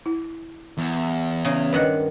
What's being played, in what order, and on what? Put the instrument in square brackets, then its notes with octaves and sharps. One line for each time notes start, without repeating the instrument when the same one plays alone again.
[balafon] E4
[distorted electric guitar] E2
[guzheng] C#3 D#4
[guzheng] G2 D#3 F#5 [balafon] B4 D#5